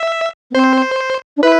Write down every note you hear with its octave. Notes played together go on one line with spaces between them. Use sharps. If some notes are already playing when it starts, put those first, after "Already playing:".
Already playing: E5
B3
C4 C5
D4
E4 B4